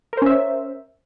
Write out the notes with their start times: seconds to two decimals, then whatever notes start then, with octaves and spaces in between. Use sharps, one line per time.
0.13 A#4
0.17 C5
0.22 C#4
0.26 E5